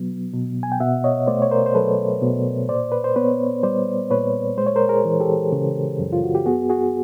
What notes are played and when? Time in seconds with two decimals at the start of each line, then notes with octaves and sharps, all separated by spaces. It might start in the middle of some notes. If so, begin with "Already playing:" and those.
Already playing: B2 F#3 B3
0.33 B2
0.63 G#5
0.72 G5
0.80 B2 E5 F#5
1.04 C#5 D#5
1.27 A3 C5 D5
1.42 C#5
1.51 A#4 C5
1.66 C5
1.75 F#3 A4 B4
2.22 B2
2.69 A#2 C5 D5
2.92 B4
3.04 C5
3.16 B3 B4 C#5
3.63 G3 C5 D5
4.10 A#2 B4 C#5
4.58 G#3 C5
4.67 C#5
4.76 A#4 C5
4.89 G#4 A#4
5.05 E3
5.20 G4 A4
5.52 C#3
5.99 F#2
6.13 F4
6.24 F#4
6.35 G4
6.46 B3 F#4 G#4
6.69 F#4 G#4